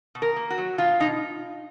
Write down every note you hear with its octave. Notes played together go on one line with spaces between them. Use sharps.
B2
A#4
A#3
F#4
F#3
B2 F4
B2 D#4